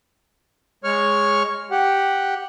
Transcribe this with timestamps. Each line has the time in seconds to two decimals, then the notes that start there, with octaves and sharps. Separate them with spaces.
0.84 G#3 C#5 C#6 F6
1.71 G4 F#5